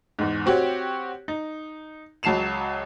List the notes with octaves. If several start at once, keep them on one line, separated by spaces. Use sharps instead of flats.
E2 G#2
C4 F#4 G4 C#5
D#4
C#2 F#3 A5 C7 E7 F7